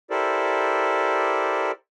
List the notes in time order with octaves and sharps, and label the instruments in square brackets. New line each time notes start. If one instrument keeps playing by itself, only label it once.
[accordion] E4 G4 A4 A#4 C5 D5